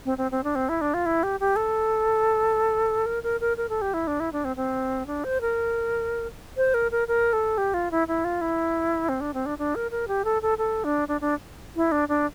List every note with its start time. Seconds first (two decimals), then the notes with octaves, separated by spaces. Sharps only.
0.05 C4
0.18 C4
0.31 C4
0.44 D4
0.55 C4
0.69 E4
0.81 D4
0.94 F4
1.06 E4
1.23 G4
1.40 G4
1.56 A4
3.06 A#4
3.23 A#4
3.41 A#4
3.57 A#4
3.69 A4
3.81 G4
3.94 E4
4.07 D4
4.20 E4
4.32 D4
4.45 C4
4.56 C4
5.07 D4
5.24 C5
5.41 A#4
6.57 C5
6.74 A#4
6.91 A#4
7.08 A#4
7.33 A4
7.58 G4
7.74 F4
7.91 E4
8.08 E4
8.24 F4
8.41 E4
9.09 C4
9.21 D4
9.34 C4
9.46 D4
9.58 D4
9.75 A#4
9.91 A#4
10.08 G4
10.25 A4
10.42 A4
10.58 A4
10.84 D4
11.08 D4
11.21 D4
11.76 E4
11.92 D4
12.09 D4